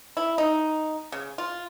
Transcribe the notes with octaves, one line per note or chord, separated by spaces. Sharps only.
E4
D#4
C#3
F4